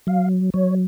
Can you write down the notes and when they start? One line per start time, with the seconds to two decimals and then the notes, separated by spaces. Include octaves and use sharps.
0.07 F#3 F5
0.54 F#3 C#5